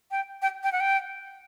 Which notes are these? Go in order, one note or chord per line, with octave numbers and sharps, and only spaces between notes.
G5
G5
G5
F#5
G5